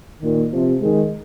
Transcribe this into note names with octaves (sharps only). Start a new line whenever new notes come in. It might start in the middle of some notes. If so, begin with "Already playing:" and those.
A#2 D#3
C3 F3
D#3 G#3